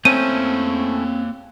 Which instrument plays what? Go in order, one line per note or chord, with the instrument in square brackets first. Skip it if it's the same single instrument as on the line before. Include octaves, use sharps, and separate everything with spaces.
[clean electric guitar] A3 C#4 E4 [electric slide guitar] A#3 C#5 [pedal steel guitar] C4 [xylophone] D#7